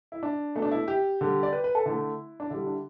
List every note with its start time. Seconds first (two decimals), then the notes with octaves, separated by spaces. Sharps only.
0.12 E4
0.23 D4
0.56 B2 A3
0.62 D4
0.71 E4
0.88 G4
1.21 D3 G3
1.43 D5
1.53 B4
1.64 B4
1.75 A4
1.85 D3 A3 E4
2.40 D4
2.50 D3 G3 E4
2.67 D4